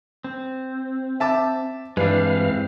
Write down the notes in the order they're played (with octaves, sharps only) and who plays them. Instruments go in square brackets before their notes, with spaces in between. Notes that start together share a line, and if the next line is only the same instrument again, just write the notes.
[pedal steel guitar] C4
[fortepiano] E5 A5 D6
[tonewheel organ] G2 E3 F5 [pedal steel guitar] G#3 C4 [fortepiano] D4 B4